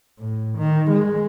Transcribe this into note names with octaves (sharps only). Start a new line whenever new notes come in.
A2
D#3
G#3